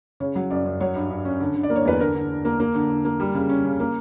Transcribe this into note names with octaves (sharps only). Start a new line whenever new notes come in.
C#3 C#5
F#3
F#2 D5
F#2
F#3 C#5
G2
G2
C#4
D3
D3
D5
A#3
C#5
E2 B4
D3 A#4
D3
D3
A#3
A#3
D3
D3
A#3
G3
C#3
C#4
C#3
A#3